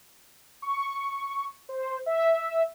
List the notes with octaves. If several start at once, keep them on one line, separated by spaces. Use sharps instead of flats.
C#6
C5
E5